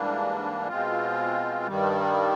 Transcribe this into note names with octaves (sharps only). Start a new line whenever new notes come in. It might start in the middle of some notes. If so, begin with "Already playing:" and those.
Already playing: G#2 E3 G3 A#3 D4
B2 G#3 C4 F4
G2 D#3 G3